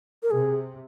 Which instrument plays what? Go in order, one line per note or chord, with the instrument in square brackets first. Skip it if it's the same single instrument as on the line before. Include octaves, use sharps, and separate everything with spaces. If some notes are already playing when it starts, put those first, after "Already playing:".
[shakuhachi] A#4
[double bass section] C3 [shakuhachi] G#4